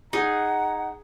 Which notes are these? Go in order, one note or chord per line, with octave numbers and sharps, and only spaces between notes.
D#4 G#4 F#5 A#5